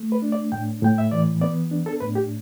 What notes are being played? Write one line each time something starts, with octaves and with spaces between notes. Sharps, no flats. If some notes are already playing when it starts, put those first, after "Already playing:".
Already playing: A3
B4
D4
D5
A2 G5
A2 G5
E5
E3 D5
B3 D5
D4
A4
A2 B4
G4